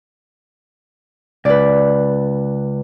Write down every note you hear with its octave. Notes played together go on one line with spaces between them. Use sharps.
C#2 B4 D5